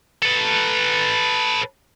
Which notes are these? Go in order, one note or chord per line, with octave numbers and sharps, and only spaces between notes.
A4 B4